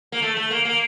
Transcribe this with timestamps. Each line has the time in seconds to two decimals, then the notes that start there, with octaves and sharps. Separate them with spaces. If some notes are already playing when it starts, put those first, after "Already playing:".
0.12 A#3
0.22 A3
0.37 A3
0.51 A#3
0.65 A#3